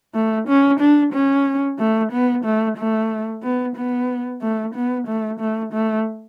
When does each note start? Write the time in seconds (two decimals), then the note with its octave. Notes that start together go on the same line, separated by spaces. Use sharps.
0.14 A3
0.48 C#4
0.80 D4
1.13 C#4
1.79 A3
2.12 B3
2.44 A3
2.77 A3
3.43 B3
3.76 B3
4.42 A3
4.75 B3
5.07 A3
5.39 A3
5.73 A3